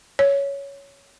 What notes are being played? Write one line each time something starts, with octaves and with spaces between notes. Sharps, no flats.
C#5